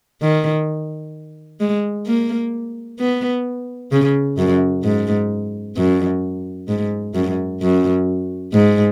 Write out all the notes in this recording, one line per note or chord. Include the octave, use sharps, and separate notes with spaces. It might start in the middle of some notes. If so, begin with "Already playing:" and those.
D#3
G#3
A#3
B3
C#3
F#2
G#2
F#2
G#2
F#2
F#2
G#2